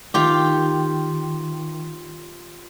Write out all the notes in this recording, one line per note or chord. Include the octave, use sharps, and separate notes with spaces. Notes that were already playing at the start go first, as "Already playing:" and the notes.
D#3 F4 G4